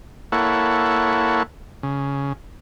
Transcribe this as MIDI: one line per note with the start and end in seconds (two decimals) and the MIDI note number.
0.32 1.43 58
0.32 1.43 64
0.32 1.43 69
0.32 1.43 73
0.32 1.43 78
1.83 2.33 49